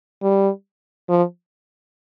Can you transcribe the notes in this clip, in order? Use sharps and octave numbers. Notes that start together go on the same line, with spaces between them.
G3
F3